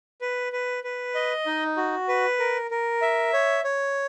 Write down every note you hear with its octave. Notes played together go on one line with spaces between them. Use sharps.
B4
B4
B4
D#5
D#4
F#4
B4
A#4
A#4
E5
C#5
C#5